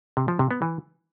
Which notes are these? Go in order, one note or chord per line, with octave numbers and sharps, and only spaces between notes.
C3
F3
C3
B3
E3